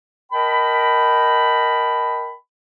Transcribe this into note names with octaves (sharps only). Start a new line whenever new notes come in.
A#4 D#5 G5 A5 B5